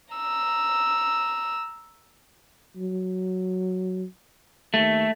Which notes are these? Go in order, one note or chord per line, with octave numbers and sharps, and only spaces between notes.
A#5 E6
F#3
D#2 A3